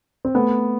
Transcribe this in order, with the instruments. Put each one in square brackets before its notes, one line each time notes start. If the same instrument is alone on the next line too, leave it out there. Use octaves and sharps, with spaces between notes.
[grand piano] C4
A3 B3